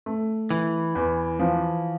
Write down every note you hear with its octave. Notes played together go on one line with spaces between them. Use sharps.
A3
E3 E4
E2
F3